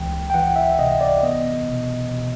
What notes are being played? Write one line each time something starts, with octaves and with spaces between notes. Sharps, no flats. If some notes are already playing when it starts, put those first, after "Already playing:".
Already playing: C#2 E3 G5
G5
E3 F#5
E5
C3 D#5
D5
B3 D#5
B2
B2